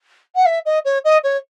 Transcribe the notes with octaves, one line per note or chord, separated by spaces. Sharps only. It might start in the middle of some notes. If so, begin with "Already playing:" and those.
F#5
E5
D#5
C#5
D#5
C#5